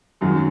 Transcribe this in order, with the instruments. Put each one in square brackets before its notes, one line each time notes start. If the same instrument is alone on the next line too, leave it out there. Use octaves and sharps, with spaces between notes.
[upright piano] F#2 D#3 G#3 [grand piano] F#3